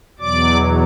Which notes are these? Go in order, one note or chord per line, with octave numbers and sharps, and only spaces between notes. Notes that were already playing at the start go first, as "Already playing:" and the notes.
E2 B2 F#3 D5 D6